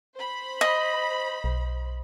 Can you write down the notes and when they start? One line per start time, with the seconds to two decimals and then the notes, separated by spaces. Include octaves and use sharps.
0.15 C5 B5
0.61 D#5
1.44 B1